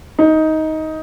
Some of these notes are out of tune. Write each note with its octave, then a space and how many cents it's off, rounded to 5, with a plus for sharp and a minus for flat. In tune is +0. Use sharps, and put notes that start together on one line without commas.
D#4 +15